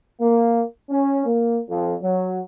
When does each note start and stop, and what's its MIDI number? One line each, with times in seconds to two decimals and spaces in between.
0.21 0.63 58
0.89 1.23 61
1.25 1.59 58
1.69 1.94 41
2.02 2.40 54